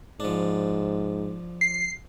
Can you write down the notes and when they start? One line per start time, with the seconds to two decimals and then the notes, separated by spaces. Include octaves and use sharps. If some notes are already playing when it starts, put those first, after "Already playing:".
0.20 G#2 F3 D4
1.61 C7